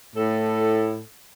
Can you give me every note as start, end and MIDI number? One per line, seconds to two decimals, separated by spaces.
0.15 1.01 45
0.15 1.01 69